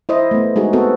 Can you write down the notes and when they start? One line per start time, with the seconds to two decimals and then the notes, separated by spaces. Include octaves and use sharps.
0.09 E4 C5 D#5
0.31 A3 B3
0.56 G#3 D#4 F#4 G#4
0.73 B3 C4 F#4 A4